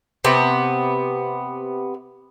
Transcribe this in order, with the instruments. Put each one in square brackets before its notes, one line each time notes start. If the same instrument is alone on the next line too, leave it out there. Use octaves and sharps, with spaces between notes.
[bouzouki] C3 B3